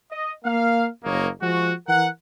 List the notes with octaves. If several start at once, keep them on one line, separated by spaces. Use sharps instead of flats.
D#5
A#3 F5
F#1 F#2 A#3 C#5 D#5
F3 G#3 F#4
E3 A#4 F#5